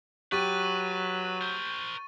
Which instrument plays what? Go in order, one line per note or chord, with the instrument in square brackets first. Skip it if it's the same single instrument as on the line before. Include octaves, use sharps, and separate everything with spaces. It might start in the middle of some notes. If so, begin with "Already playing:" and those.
[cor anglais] F#3 [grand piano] G4 [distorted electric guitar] B4 [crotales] C#6 A6 D#7
[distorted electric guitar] A#4 C5